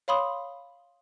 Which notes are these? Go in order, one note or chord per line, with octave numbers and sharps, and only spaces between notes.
C#5 F5 B5 C6 D#6